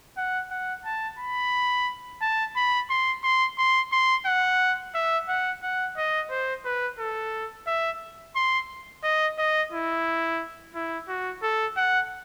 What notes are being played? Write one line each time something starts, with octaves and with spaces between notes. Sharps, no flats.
F#5
F#5
A5
B5
A5
B5
C6
C6
C6
C6
F#5
E5
F#5
F#5
D#5
C5
B4
A4
E5
C6
D#5
D#5
E4
E4
F#4
A4
F#5